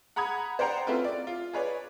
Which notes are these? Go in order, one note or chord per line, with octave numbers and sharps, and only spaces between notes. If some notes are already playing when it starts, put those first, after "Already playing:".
F#5 A#5 B5 D#6 G#6
C5 D5 F#5 G5 A#5
A3 C4 C#4 E4 F4 B4
D5
F4
G#4 B4 C#5 D5